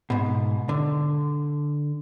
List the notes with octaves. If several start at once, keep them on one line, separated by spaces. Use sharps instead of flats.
G#2 B2
D3